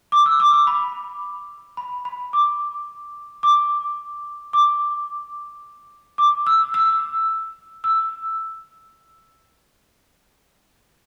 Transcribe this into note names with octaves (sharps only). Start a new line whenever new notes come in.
D6
E6
D6
D6
B5
B5
B5
D6
D6
D6
D6
E6
E6
E6